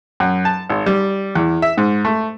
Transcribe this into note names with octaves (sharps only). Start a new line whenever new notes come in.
F#2
A5
G#1
G3
E2
E5
G#2
A3